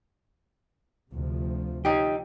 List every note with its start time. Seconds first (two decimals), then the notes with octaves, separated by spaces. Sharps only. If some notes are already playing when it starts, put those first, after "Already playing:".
1.13 D2 C3 F3
1.85 F3 D#4 G4